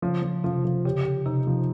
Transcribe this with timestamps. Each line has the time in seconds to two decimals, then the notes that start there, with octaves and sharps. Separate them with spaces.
0.02 C#3 F3
0.23 F3
0.44 C3 F3
0.65 F3
0.85 C#3 G4
1.05 G4
1.25 C3 D#4
1.47 F3